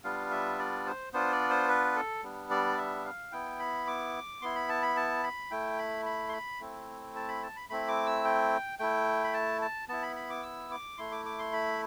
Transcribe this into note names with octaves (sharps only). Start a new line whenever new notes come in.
G3 B3 D4 F4 F5
E5
D5
C5
B3 D4 F4 C5
D5
C5
B4
A4
G3 B3 D4
D5
E5
F5
B3 E4 G5
B5
D6
B3 E4 C6
B5
A5
B5
A5
B5
A3 E4 G5
B5
B5
C6
B5
A3 C4 E4
A5
B5
A5
B5
A3 C4 E4 B5
D6
E6
G5
A3 E4 G5
B5
A5
A5
B3 E4 A5
B5
B5
D6
E6
D6
A3 E4 C6
D6
D6
C6
B5